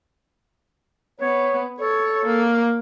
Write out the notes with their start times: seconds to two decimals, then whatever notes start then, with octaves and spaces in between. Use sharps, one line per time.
1.20 B3 C#5
1.80 A4 C#5
2.26 A#3